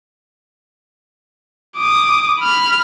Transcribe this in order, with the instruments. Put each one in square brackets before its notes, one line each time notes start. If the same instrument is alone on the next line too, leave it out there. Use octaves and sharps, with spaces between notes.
[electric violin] D6 D#6
B5 F6